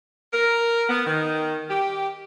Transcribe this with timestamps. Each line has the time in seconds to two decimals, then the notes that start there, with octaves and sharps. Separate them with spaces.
0.33 A#4
0.90 B3
1.07 D#3
1.70 G4